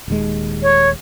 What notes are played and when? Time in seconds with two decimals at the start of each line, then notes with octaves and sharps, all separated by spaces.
0.08 D#1 D#2 G#3
0.63 C#5